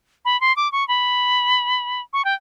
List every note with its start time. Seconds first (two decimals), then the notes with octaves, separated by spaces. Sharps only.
0.25 B5
0.41 C6
0.56 D6
0.72 C#6
0.88 B5
2.13 C#6
2.25 G5